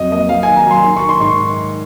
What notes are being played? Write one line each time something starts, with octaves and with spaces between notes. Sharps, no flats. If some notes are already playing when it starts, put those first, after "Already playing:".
Already playing: F2 F#3 D#5
A#3 D#5
F#3 F5
G#5
D#3
A#5
F#3 C6
D#3
C#6
D#3
C6
G#2 C#6